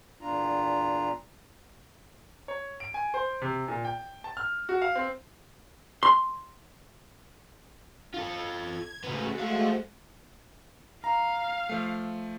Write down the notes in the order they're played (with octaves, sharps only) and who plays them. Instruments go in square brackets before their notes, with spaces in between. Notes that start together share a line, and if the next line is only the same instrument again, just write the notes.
[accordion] E2 A#2 D4 F4 A#5
[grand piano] C#5
D7
G#5
C5
C3
A#2
G5
A5
F6
F#4
F5
C4
[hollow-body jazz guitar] C6
[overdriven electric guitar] F4 A4
[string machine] G#6
[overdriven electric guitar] C#3 B3 [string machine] G#3 A3 F#4
[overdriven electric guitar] C5 F5
[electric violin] F5 [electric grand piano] A#5
[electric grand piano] F3 A3